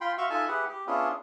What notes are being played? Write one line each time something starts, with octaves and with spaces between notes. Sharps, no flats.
F4 G5 B5 C6
F#4 E5 F5 C6 C#6
D#4 F4 A4 E5 G#5 A5
E4 G4 G#4 B4 F#5
G4
B3 C#4 D4 E4 F4 G#4